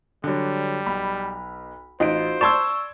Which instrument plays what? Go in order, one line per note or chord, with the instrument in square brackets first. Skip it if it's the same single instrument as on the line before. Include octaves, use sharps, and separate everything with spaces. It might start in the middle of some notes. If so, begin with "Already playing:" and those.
[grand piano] D3 F#3 [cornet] G3
[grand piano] B1 [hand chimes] B5
[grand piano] A1 [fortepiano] D#4 [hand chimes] F4 F#4 D7 [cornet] C5
[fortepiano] D5 A5 C6 [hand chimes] C#6 E6 [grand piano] G#6 E7